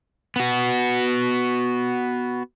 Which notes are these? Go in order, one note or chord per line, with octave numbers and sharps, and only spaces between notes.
B3 F#4